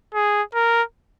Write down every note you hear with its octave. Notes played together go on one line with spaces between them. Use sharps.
G#4
A#4